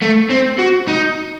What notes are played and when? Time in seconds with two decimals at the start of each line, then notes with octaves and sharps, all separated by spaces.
0.02 A3
0.30 C4
0.59 F#4
0.88 D#4